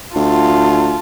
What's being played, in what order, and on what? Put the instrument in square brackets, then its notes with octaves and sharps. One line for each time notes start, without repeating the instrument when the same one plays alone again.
[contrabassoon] D2 [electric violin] F4 A5